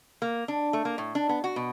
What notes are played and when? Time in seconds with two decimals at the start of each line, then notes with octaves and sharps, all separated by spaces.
0.22 A#3
0.48 D4
0.73 A3
0.85 A#3
0.98 A2
1.15 D4
1.29 B3
1.44 F#4
1.56 B2